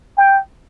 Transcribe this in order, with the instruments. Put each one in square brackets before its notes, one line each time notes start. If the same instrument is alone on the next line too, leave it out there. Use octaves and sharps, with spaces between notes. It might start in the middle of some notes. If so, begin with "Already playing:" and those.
[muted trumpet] G5